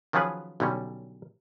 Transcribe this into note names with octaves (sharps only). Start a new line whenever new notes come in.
D#3 F3 F#3 C#4 G#4 B4
B1 D3 G3 C#4